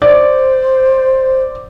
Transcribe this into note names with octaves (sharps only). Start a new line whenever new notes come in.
C5 D5